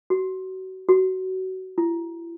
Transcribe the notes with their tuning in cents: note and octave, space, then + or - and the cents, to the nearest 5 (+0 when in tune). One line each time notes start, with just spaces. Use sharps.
F#4 +30
F#4 +25
E4 +35